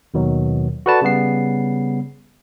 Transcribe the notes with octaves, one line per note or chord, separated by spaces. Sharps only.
D#2 B2 D#3 F#3
F#4 A4 B4 D5 A5 B5
C#3 G3 B3 C7